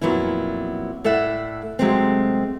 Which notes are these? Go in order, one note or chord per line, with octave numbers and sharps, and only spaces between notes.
F2 A#2 F#3 B3 E4
A2 A4 D5 E5 F#5
C3 F#3 G#3 A3 C4